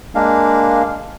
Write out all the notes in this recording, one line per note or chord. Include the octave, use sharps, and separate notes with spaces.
G#3 A#3 D4 F5